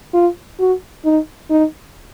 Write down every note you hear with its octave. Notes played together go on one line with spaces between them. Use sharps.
F4
F#4
D#4
D#4